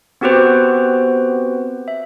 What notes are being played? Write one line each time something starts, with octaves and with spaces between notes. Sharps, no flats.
B3 C4 F#4 G4 B4 C5
E5